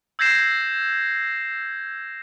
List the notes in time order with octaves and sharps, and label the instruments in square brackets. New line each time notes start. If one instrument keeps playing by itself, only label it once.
[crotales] E6 G6 G#6 A#6 C7 E7